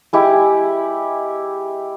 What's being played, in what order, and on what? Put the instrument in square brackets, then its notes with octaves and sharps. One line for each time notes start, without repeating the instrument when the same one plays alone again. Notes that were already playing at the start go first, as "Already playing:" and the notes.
[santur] G#3 E4 G4